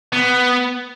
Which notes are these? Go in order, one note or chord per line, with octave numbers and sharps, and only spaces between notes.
B3